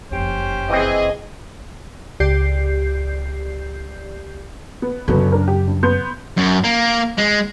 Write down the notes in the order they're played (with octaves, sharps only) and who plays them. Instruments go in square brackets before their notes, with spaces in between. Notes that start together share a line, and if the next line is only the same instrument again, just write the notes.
[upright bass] F#1 F2 [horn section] C#4 G4 C5
[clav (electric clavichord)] E3 C4 [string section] G#4 D#5
[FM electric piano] C#2 G4 D5 G6 C7
[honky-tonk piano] B3
[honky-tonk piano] G1 F#3 B3 [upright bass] F#2 C#3
[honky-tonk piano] D4 A#4
G4
G2
B3 C6 G6
[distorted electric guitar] F#2
A#3
G#3